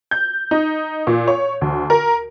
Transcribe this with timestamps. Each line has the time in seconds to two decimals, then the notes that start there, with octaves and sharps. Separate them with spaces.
0.11 G6
0.51 D#4
1.07 A#2
1.28 C#5
1.61 D2
1.90 A#4